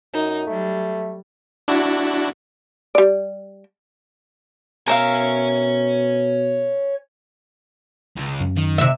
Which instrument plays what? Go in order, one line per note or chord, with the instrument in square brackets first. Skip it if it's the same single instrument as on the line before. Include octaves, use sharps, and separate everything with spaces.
[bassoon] F#2 [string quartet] D#4
[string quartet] F#3 G3 [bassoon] A3
[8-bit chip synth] D4 E4 F#4
[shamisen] G3 D5
[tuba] B2 [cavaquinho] A#4 E5 F5 [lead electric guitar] C#5 G#5
[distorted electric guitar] C#2
[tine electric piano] F#2
[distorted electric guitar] D#3
[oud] C3 E5